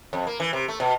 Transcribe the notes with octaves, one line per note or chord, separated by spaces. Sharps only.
F2
A#3
E3
C3
A3
B2